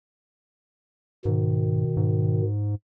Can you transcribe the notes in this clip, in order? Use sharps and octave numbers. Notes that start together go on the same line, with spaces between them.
G#2 B2 D#3
G#2